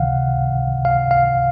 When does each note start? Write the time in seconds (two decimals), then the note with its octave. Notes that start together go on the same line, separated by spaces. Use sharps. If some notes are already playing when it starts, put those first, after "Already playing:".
Already playing: C#2 C3 D#3 F5 F#5
0.85 F5
1.11 F5